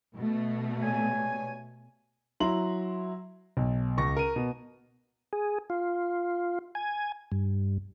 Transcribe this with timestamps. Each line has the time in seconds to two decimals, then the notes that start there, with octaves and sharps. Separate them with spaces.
0.15 B2 A3
0.82 G2 C#5 G#5
2.40 F#3 E4 A#5 C6 F#7
3.57 B1
3.97 C#2 C#6 A#6
4.16 A#4 D#7
4.36 B2
5.33 G#4
5.70 F4
6.75 G#5
7.32 G2